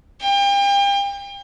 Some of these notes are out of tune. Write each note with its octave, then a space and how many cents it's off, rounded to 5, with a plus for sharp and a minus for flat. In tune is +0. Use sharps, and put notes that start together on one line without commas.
G5 +35